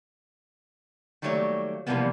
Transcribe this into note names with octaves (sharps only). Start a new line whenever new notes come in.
D#3 F#3 G3 A3 A#3 C#5
C3 E3 F3 G3 A#3 B3